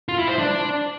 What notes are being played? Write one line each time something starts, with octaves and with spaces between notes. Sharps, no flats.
F4
E4
C5
D4